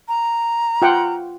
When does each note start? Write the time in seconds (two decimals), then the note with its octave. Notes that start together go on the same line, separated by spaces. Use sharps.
0.08 A#5
0.82 F4 F#5 G5